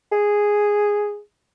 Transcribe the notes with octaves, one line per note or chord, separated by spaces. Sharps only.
G#4